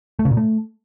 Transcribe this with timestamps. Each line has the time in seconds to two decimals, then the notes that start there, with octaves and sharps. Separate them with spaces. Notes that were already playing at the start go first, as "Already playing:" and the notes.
0.19 A3
0.25 C#3
0.31 A#2
0.37 A3